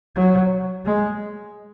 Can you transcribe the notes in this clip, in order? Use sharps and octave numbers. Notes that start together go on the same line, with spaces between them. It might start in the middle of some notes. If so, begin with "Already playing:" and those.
F#3
G#3